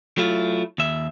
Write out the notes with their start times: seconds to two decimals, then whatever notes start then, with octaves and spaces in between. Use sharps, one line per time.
0.18 F#3 A3 E4 F4
0.78 D#2 E5